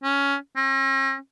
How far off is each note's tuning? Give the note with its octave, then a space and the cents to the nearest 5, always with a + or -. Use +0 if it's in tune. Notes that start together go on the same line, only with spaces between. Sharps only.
C#4 +10
C#4 -45